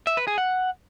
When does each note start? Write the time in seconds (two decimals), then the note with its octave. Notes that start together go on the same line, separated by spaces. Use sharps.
0.07 E5
0.17 B4
0.27 G#4
0.38 F#5